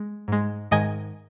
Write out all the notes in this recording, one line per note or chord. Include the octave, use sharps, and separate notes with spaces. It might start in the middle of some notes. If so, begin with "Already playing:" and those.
Already playing: G#3
G#2 G#3
G#2 D#3 G#3 D#5 G#5